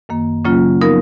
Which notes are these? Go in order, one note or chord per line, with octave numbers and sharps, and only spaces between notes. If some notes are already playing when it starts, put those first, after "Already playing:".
F#2 D#3 A#3
C#3 F#3 A#3 C#4 F4
F3 B3 D#4 A#4